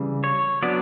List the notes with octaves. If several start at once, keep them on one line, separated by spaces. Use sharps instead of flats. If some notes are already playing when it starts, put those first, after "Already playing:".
Already playing: C#3 E3 G3
C#5
F#3 B3 D4 D5